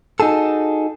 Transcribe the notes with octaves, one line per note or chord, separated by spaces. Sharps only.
D#4 F#4 G#4 A4